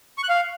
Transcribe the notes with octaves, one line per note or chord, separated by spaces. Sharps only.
C#6
F#6
F5